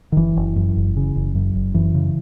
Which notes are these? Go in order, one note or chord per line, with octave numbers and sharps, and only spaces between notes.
D#3
F#1 E3
F#1
F#2
F#1
C#3
F#1
F#2
F#1
F#2 E3
C#3